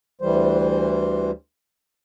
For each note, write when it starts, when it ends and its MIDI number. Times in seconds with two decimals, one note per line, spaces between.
0.21 1.31 38
0.21 1.31 52
0.21 1.31 55
0.21 1.31 72